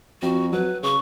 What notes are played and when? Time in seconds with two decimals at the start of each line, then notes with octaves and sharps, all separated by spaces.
0.22 F2 F#4
0.52 F#3 B4
0.83 C#3 C#6